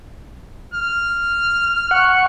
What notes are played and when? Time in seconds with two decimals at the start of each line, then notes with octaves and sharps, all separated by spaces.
0.74 F6
1.91 F#5 C#6